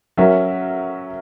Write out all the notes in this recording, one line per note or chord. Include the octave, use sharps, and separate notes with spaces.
F#3 C#4 F#4 A#4 E5